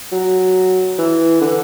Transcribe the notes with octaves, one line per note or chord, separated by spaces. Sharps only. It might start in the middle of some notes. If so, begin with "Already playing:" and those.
F#3
E3
D3